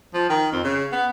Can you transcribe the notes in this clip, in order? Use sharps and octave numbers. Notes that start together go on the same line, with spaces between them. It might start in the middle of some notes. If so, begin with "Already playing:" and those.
F3
D#3
F2
C#3
B3